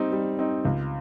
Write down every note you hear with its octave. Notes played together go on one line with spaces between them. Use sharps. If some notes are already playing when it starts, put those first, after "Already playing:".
Already playing: G3 C4 D#4
G3
C4 D#4
C#2